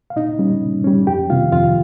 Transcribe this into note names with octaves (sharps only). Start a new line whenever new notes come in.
F5
A#2 D#4 D#5
G3 C#4
A#2
G3 C#4
F2 G4 G5
C3 D#3 F4 F5
F2 F4 F5